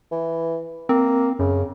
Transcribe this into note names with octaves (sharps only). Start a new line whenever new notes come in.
E3
A#3 C4
F#2 C#3